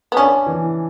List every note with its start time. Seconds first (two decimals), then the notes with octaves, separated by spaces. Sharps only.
0.12 B3
0.17 C#4 D4
0.46 E3